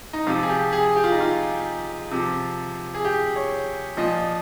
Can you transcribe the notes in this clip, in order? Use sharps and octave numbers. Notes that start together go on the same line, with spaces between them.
D#4
C3 F3 F4
G#4
G4
G#4
G4
F4
D#4
F4
C3 F3
G#4
G4
C#5
A#2 F3 D#5